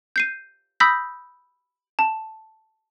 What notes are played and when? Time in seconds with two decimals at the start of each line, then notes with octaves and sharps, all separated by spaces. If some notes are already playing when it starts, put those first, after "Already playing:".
0.16 G6 C7 D#7
0.80 B5 D#6 E6 G6 A#6 B6
1.99 A5